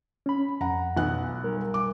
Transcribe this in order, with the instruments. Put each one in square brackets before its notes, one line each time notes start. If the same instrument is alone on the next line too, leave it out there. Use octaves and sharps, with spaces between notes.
[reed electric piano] C#4 B5
[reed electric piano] F2 F#5 [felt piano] A#5
[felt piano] B1 B3 F#6
[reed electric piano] G3 A#4
[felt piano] D6